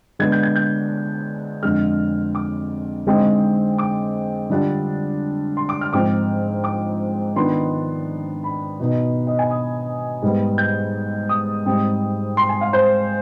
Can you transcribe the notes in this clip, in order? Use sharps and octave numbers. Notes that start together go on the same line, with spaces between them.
D3 G#3 B3 D4 G#6
G6
G#6
G6
F2 D3 G#3 F6
D6
D3 G#3 C4 D#4
D6
D3 G3 D4 F4
C6
D6
F6
G#2 F3 C4 D6
D6
D#3 B3 D4 F4 C6
B5
B2 B3 D#4
D#5
G#5
D#6
G#2 G3 B3
G6
D#6
G#2 G3 C4 D#4
C6
G#5
F5
C5